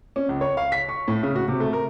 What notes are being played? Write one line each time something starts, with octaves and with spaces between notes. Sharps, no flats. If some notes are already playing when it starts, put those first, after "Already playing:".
C#4
C#2
C#5
F5
B6
C#6
A2
C#3
F#4
C3
A3
A#4